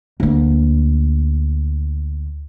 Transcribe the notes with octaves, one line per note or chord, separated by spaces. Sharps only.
D2 A#3